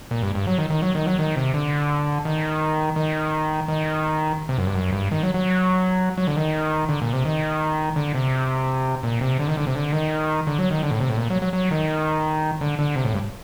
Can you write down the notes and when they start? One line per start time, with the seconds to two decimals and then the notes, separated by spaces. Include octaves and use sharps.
0.11 A#2
0.22 G2
0.35 G2
0.47 F#3
0.58 D#3
0.70 D#3
0.82 F#3
0.95 D#3
1.06 F#3
1.19 D#3
1.36 C3
1.54 D3
2.25 D#3
2.96 D#3
3.68 D#3
4.49 C3
4.58 F#2
4.67 G2
4.75 F#2
4.93 G2
5.11 D#3
5.23 F#3
5.34 F#3
6.18 F#3
6.27 D3
6.36 D#3
6.89 D3
7.02 A#2
7.13 C3
7.25 D#3
7.96 D3
8.15 C3
9.03 A#2
9.21 C3
9.39 D3
9.48 D#3
9.57 D3
9.67 C3
9.75 D3
9.92 D#3
10.47 D3
10.58 F#3
10.71 D#3
10.83 D3
10.91 A2
11.00 C3
11.10 A2
11.17 A#2
11.30 F#3
11.42 F#3
11.53 F#3
11.71 D#3
12.61 D3
12.79 D3
12.96 C3
13.05 A2
13.14 G2